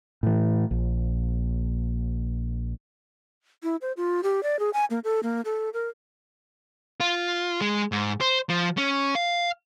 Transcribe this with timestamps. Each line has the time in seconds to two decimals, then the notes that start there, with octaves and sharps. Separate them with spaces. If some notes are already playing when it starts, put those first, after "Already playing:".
0.23 A2 E3
0.71 A#1
3.63 E4
3.82 C5
3.97 F4
4.23 G4
4.43 D5
4.59 G#4
4.73 G#5
4.90 A#3
5.04 A4
5.23 A#3
5.45 A4
5.73 A#4
7.00 F4
7.61 G#3
7.92 G#2
8.21 C5
8.49 F3
8.77 C#4
9.15 F5